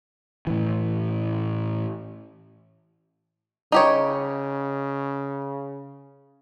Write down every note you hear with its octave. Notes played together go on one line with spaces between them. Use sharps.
A2 E3
C#3 D#4 G4 C#5